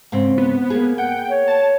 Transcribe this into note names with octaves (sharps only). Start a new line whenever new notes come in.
G#2 C#3 C4
B3
A#3 G#4
F#5 G5
C#5
A5